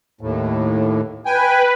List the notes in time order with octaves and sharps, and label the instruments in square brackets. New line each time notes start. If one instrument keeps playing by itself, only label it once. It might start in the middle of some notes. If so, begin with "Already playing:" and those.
[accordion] D#2 A2
[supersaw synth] B4 [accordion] G5 G#5